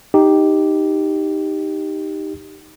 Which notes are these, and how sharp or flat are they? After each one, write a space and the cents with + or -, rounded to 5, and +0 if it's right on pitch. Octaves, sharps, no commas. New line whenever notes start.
D#4 +0 G4 +0